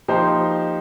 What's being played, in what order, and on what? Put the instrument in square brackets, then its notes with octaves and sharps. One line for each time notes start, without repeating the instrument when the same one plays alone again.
[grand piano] F3 A#3 D#4 G4 C5